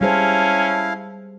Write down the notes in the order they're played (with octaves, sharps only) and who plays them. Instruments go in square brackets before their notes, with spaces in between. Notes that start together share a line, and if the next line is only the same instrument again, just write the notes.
[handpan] G3 G#4 C5 [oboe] C#4 [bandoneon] E4 F5 [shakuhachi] A5